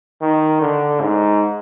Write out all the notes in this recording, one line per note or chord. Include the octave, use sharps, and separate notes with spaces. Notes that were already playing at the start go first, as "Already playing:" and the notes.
D#3
D3
G#2